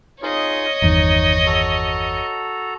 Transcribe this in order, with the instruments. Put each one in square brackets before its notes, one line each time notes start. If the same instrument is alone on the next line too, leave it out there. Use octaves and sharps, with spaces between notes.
[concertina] D#4 F4 G#4 [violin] C#5 D#5
[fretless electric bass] G1 E2 D#3 [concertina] D#4
[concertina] F#4 A4 A#5